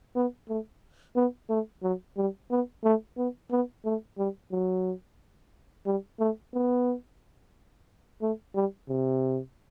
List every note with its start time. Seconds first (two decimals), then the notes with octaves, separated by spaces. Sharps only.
0.16 B3
0.49 A3
1.16 B3
1.50 A3
1.83 F#3
2.17 G3
2.51 B3
2.84 A3
3.18 B3
3.52 B3
3.85 A3
4.18 G3
4.52 F#3
5.86 G3
6.20 A3
6.54 B3
8.22 A3
8.55 G3
8.89 C3